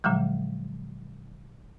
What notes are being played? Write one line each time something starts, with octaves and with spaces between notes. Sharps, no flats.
A#2 D3 F3 F#3 G#3